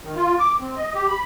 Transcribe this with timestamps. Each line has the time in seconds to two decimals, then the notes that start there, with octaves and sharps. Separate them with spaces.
0.03 D#3
0.16 F4
0.39 D6
0.60 C4
0.76 D#5
0.94 G4
1.08 B5